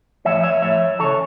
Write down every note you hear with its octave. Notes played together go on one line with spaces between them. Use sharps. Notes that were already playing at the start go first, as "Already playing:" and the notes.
A2 F3 C#5 E5
C#5 E5
A2 F3 C#5 E5
C#3 E3 A4 C#5